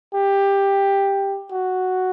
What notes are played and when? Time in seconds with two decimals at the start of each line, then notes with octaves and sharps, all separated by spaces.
0.14 G4
1.52 F#4